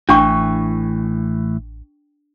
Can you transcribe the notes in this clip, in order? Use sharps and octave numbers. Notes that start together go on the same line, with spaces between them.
A1 A2 E3 D4 G5 C#6